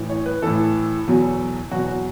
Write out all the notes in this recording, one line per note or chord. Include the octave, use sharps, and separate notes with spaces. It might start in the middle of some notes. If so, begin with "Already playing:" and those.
Already playing: A2 E3
C#5
B4
A2 E3 A4
E2 B2 F#3
E2 B2 F#3 F#4
F#4